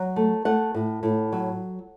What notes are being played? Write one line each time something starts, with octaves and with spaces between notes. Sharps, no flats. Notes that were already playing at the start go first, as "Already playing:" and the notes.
Already playing: F#3
A3
A3 F#5
A2
A2
F#3